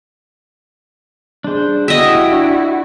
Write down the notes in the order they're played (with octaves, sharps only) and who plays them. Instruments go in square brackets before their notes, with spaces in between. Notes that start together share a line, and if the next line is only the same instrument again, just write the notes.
[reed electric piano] G3 G#4 [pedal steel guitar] D4 C5
[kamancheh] E4 F#4 [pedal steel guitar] G4 [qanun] D#5 E5
[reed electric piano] D4